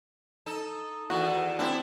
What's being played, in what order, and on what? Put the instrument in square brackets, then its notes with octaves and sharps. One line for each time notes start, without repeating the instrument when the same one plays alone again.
[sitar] D#4 A4
[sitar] E2 D#3 [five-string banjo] F#4
[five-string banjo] C4 D4 [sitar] E4 G4